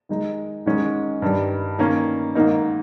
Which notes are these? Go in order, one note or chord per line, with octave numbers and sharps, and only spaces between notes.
D#3 G#3 D#4
G#2 D#3 G#3 C#4
G2 D#3 G3
D#3 A#3 C#4
G#2 D#3 A#3 D#4